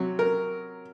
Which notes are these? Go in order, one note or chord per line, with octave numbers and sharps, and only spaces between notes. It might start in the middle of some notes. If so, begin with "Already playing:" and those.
Already playing: C3 F#3
A#4